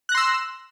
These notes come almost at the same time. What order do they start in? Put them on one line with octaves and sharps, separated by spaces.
F#6 A#6 C6 E6